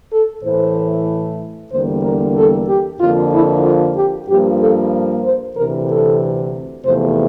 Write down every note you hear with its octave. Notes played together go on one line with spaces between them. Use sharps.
A4
A2 E3 A3 C5
E2 D3 G3 A#3 C5
A#4
A4
G4
F2 D3 F3 A#3 F4
E4
F4
G4
G2 F3 A#3 G4
A4
C5
D2 C3 E3 A#4
A4
E2 C3 F3 A3 C5